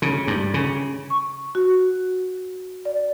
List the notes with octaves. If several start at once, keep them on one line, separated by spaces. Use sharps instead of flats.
C#3
G2
C#3
C#6
F#4
D5